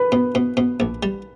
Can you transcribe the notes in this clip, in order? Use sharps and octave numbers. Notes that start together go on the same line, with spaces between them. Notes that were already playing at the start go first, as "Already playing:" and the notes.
Already playing: B4
B2
B2
B2
A#1
G3